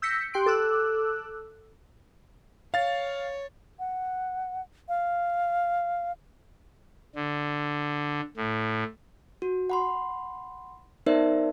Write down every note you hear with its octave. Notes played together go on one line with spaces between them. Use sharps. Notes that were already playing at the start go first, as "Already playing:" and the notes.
E6 G6 A#6 B6 C#7
G4 G5 C6 F#6 D7
A4 D6 E6 F#6
C#5 F5 A6
F#5
F5
D3
A2
F#4
F#5 B5 C6
B3 D#4 A#4 C5 D5 E5